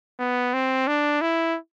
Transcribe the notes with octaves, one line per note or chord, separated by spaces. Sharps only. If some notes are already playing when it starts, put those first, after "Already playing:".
B3
C4
D4
E4